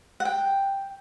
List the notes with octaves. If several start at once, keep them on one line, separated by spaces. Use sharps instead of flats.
F#5
G5